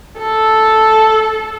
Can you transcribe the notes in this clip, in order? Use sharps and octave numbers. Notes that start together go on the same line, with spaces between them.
A4